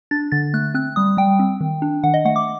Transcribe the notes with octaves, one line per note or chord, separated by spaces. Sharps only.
D4 A6
D3 A6
A3 F#6
C4 F#6
G3 D#6
G3 G5
C4
D#3
D4
D#3 F#5
D#5
A3 F#5
D6